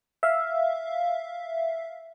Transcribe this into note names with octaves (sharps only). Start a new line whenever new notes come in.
E5 F5